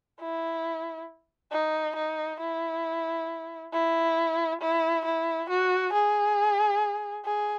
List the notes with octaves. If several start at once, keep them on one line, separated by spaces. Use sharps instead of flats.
E4
D#4
D#4
E4
E4
E4
E4
F#4
G#4
G#4